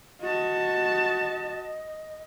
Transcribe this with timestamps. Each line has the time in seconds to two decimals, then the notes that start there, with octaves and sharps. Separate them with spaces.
0.21 F#4 D#5 A5